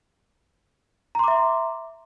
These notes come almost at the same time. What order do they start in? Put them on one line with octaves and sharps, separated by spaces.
A#5 C6 D6 E5